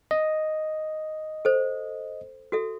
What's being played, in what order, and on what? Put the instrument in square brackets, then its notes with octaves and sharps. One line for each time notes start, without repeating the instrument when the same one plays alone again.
[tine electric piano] D#5
[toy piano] A4 C5
F#4 A4 E5